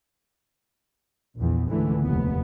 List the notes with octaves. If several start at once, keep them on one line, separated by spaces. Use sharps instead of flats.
A#1 E2
C#2 G#2 D3 E3 A3
F1 D#2 B3